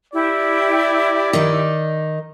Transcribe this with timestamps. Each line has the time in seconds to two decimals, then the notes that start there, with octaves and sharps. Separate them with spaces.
0.13 E4 G4 D5
1.33 D#3 D#4